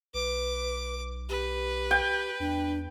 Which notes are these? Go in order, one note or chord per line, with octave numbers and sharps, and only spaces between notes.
B1 B4 D6
G4 B4
G5
E2 D4